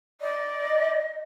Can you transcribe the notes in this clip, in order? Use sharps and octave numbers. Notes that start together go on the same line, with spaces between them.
D5 D#5